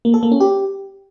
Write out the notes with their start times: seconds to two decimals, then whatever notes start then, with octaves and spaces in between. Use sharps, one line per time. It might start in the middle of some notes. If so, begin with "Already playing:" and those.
0.05 A#3
0.14 A4
0.23 A#3
0.32 C#4
0.40 G4